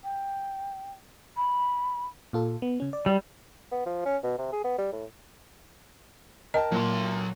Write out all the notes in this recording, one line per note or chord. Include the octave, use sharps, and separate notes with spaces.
G5
B5
A#2 F4 A4
B3
C#3 C#4
D5
G3
B3
F3
C#4
B2
C3
G#4
B3
G3
A2
A#4 D#5 G5 A5
A#2 F#3 C6